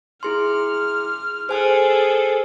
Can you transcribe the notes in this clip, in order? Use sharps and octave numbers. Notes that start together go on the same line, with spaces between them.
E4 G#4 C6 F6
G#4 A4 C5 G#5 F6